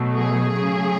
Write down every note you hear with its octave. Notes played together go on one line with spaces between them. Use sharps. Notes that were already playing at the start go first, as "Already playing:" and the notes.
Already playing: B2 F#3 A3
G#4
C#3 F#3 A3